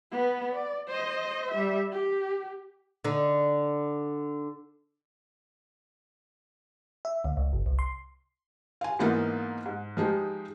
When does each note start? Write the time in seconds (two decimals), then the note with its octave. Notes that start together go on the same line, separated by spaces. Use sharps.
0.11 B3 B4
0.53 D5
0.88 C5 D#5
1.51 G3 E5
1.92 G4
3.04 D3 D#4
7.05 E5
7.24 D2
7.37 C#2
7.53 G1
7.66 C2
7.79 C6
8.81 F5 G#5
8.99 G#2 E3 A#3 B3 D#4 F4
9.66 G#2
9.97 F3 G#3 D#4 G4